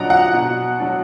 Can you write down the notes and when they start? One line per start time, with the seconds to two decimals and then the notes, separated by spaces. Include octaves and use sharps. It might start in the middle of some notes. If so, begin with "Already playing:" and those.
Already playing: A#2 F#3 D4 D#5 F#5 A#5
0.10 F#5
0.33 B2
0.80 F#3 D4